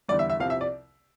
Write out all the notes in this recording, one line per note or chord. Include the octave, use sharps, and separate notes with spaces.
E2 D3 G3 D5
E5
E5
C2 C3 F3 F5
E5
D5